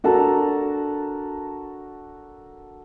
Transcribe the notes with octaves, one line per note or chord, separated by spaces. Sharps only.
D4 F#4 A4 A#4 A5 A#5